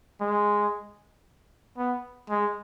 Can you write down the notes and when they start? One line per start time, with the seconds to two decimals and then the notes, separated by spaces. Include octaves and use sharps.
0.21 G#3
1.78 B3
2.30 G#3